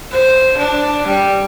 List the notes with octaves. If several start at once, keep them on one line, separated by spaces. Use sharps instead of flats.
C5
D4
G3